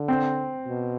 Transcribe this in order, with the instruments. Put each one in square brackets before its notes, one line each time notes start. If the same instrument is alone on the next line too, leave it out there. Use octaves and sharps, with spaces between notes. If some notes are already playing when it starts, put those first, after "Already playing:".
Already playing: [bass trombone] D3
[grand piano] C4
[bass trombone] B2